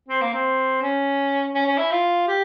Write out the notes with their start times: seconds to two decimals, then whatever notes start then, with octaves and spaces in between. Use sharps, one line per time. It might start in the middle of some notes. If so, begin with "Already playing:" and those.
0.09 C4
0.21 A#3
0.34 C4
0.82 C#4
1.55 C#4
1.66 C#4
1.78 E4
1.91 F4
2.28 G4